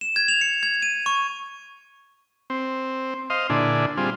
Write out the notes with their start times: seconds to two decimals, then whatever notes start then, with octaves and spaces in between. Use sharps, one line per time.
0.01 E7
0.16 G#6
0.28 F7
0.41 C#7
0.63 G#6
0.82 D#7
1.06 C#6
2.50 C4
3.30 C5 D#5 F5
3.50 A#2 D3 D4 E4 G#4
3.97 G3 C4 F4 G#4